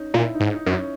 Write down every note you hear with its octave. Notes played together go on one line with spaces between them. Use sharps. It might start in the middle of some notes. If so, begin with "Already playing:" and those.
Already playing: C#4 D#4
A#2 E4
D#4
G#2
D#4
F#2
C#4